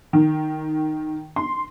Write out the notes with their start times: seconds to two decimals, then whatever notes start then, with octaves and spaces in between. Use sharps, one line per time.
0.13 D#3
1.36 C6